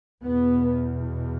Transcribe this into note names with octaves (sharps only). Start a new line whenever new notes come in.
E2 B2 B3